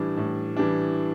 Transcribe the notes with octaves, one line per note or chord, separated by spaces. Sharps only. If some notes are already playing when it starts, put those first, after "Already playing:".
Already playing: A2 E3 G3 D4
A2
E3 G3 D4